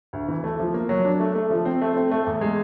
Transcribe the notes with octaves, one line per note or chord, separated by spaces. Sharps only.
D2
E3
A3
F3
A#3
F#3
D4
A3
A3
F3
C4
A3
C4
A3
E2
G#3